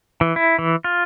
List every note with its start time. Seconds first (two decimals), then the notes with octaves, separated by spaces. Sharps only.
0.21 E3
0.36 E4
0.59 E3
0.84 F4